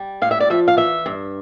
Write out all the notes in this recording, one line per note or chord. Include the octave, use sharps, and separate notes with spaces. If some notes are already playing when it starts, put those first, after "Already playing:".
Already playing: G3
A2 F5
E5
D5
F3 E5
F5
E3 E5
G2